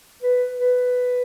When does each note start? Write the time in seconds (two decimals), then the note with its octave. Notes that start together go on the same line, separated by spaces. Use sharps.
0.22 B4
0.57 B4